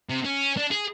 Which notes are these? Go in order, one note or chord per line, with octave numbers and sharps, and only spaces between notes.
C3
C#4
D4
G#4